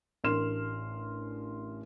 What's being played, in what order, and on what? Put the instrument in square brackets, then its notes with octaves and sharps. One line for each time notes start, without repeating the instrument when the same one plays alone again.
[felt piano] A1 D4 A#4 C6 F6 E7